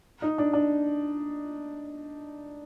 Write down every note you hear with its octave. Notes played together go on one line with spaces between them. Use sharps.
D#4
D4
D4